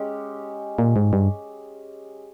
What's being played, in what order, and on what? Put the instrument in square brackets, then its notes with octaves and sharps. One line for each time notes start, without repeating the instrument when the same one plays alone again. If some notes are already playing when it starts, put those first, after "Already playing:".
Already playing: [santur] G#3 C#4 G4
[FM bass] A#2
G#2
G2